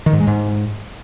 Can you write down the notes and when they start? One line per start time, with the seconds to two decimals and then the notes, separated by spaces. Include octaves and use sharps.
0.06 D#3
0.13 G#2
0.20 G#3
0.27 G#2